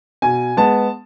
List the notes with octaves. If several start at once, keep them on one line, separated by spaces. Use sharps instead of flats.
B2 G#5
G#3 B3 A5